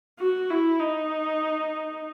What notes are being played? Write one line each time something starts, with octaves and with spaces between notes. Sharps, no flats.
F#4
E4
D#4